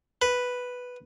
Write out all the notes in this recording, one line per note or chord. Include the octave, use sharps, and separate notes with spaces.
B4